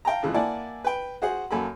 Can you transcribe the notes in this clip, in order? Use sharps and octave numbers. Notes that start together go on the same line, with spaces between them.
F5 G5 A5 A#5
F2 C#3 E3 G#3 F4
A#3 E4 D5 F#5 G#5 A5
B4 G5
F#4 G#4 C5 F#5
F#2 A#3 A4 G#5 B5